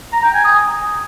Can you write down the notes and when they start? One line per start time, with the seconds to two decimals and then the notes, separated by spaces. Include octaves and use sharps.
0.13 A#5
0.23 G5
0.34 G#5
0.45 D#6